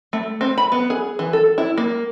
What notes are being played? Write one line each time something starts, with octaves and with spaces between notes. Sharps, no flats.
A3
C4
B5
B3
G#4
E3
A4
E4
A#3